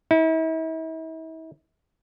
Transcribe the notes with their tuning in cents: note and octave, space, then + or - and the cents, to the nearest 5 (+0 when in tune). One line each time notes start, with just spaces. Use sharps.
E4 -40